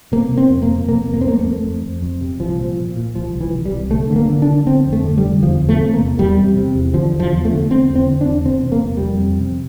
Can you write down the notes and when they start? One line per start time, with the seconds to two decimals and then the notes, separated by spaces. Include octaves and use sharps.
0.12 C3 A#3
0.31 C3
0.38 C4
0.50 F2
0.62 A#3
0.69 C3
0.88 C3 A#3
1.07 F2
1.14 A#3
1.21 C4
1.26 F2 A#3
1.39 A3
1.45 F2
1.63 F2
1.83 F2
2.02 F2
2.21 C3
2.39 C2 F3
2.58 A#2
2.77 A#2
2.96 A#2
3.15 C2 F3
3.34 C2
3.41 E3
3.54 C2
3.65 G3
3.72 C2
3.91 D3 A3
4.10 D3 A3
4.16 A#3
4.30 D3
4.42 D4
4.48 D3
4.66 D3 C4
4.86 F2
4.93 A3
5.05 D3
5.18 G3
5.24 D3
5.43 E2 F3
5.62 E2
5.69 A3
5.80 C3
5.94 A#3
5.99 E2
6.18 E2 G3
6.38 C3
6.57 C3
6.75 E2
6.94 D3 F3
7.14 E2
7.20 F3
7.32 E2
7.45 A3
7.51 D3
7.70 D3 C4
7.90 E2
7.96 C4
8.08 D3
8.21 D4
8.27 E2
8.45 C3 C4
8.65 C3
8.72 A#3
8.84 F2
8.97 G3
9.02 F2
9.22 C3
9.41 C3